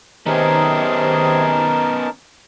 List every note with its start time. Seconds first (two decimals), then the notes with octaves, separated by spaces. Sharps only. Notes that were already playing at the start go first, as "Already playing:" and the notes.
0.26 C3 D#3 B3 C#4 D#4 G#4 A#4 A5